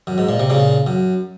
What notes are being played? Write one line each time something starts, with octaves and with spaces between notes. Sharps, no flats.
F#2
G#2
A#2
C3
A#2 C#3
F#2